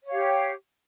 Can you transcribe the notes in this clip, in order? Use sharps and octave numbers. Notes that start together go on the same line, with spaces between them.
G4 C#5 F5